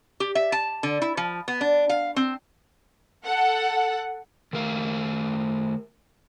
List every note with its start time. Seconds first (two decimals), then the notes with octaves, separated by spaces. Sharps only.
0.20 G4
0.35 E5
0.52 A5
0.83 D3
1.02 E4
1.17 F3
1.48 B3
1.61 D4
1.89 F5
2.16 C4
3.25 A4 F#5
4.53 D#3 A3 A#4 F5